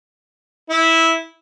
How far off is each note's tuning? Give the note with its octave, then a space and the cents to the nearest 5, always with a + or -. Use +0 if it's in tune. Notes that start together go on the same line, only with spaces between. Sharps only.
E4 -10